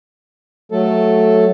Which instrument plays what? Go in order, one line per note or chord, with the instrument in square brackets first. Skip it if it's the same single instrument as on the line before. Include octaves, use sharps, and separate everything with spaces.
[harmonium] F#3 A3 A4